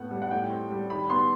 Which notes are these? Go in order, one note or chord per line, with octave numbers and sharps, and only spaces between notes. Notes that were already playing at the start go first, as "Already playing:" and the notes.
Already playing: A2 B3 F#5
G3
F#5
A2 G5
C4
G3
D#3 B5
B3 C6